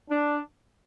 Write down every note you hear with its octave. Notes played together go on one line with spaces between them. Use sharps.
D4